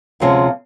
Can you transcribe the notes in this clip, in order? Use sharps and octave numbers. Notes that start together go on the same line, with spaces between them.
D2 C3 F3 G#3 C#4